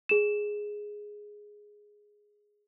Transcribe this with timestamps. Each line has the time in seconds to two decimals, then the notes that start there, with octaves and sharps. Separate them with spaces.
0.09 G#4 E7